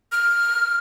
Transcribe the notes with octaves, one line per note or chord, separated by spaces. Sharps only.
F6